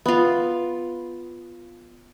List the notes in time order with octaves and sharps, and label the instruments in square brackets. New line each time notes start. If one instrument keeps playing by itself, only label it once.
[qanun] B3 F4